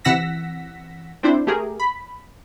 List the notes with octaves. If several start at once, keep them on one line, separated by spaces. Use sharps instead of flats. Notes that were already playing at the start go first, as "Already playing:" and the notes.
C3 E3 F#5 E6 A#6 B6
C4 D4 E4 C5
A3 G4 G#4 A#4
B5